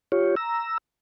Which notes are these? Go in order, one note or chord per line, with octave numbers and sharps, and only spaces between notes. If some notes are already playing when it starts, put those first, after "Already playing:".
F4 G4 C#5
A#5 E6